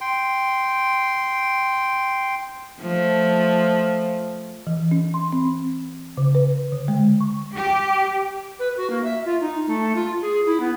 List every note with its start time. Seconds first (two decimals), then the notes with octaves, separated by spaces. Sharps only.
0.01 G5 C6
2.82 F3 A3
4.67 E3
4.91 C#4
5.14 C6
5.33 C4
6.17 C#3
6.35 B4
6.72 D3
6.88 G#3
7.21 C#6
7.57 G4
8.59 B4
8.77 F#4
8.90 A#3
9.04 E5
9.25 F4
9.40 D#4
9.67 A3
9.95 F4
10.21 G#4
10.46 E4
10.60 B3